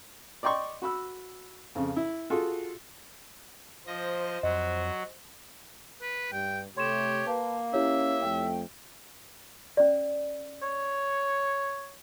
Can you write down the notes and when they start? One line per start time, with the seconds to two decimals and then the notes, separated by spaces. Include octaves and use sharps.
0.43 D5 D#5 G5 C6 C#6
0.82 F#4 B5 E6
1.75 F2 C#3
1.96 E4
2.30 F4 F#4 G#4 A4
3.87 F3 C5 D#5 A#6
4.43 F2 F#3 F#4 D#5
6.02 B4
6.33 G2 G3 G5
6.77 C3 A3 G4 C#5 C6 E7
7.27 A#3 B4 A5
7.74 C#4 E4 G4 C#5 E5
8.23 F2 A3 G5
9.77 C#4 D5
10.63 C#5